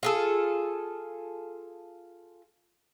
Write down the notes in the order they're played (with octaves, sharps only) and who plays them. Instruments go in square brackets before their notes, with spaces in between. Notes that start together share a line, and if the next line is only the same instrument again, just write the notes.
[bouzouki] F4 G#4 A4